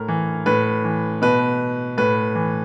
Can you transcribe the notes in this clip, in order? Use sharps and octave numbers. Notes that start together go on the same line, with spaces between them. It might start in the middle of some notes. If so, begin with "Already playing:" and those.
Already playing: A2 A#4
E3
A2 B4
E3
B2 B4
A2 B4
E3